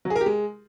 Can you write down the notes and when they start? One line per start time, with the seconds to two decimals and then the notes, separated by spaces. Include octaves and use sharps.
0.05 F#3
0.10 G#4
0.16 A#4
0.21 G4
0.26 G#3